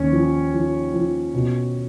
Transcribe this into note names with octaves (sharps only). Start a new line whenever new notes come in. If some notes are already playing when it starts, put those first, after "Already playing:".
Already playing: D#2 C#4
F3
F3
F3
B2